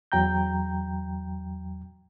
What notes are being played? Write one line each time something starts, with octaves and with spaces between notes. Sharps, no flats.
E2 F#3 G5 A#5 G6